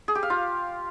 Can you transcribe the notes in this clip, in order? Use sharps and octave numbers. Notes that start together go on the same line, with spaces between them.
G#4
G4
F5
F4